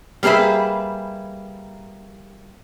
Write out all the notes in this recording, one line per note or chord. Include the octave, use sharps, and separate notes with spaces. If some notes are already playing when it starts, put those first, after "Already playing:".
G3 A#3 G#4 B4 E5